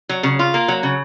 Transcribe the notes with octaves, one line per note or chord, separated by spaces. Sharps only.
F#3
C#3
F4
A#3
F#3
C#3